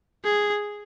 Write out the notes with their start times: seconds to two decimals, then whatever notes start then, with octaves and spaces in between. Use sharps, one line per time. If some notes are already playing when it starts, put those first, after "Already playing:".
0.24 G#4